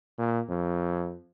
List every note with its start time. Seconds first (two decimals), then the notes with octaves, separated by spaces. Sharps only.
0.18 A#2
0.50 F2